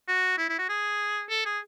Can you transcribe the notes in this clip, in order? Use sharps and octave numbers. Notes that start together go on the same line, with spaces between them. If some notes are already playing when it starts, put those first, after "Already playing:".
F#4
E4
E4
F#4
G#4
A4
G#4